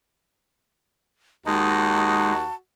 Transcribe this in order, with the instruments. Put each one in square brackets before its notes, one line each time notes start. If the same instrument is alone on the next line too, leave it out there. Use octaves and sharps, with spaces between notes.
[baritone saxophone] D#2 [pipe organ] G#3 D#4 [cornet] F#4 [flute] A5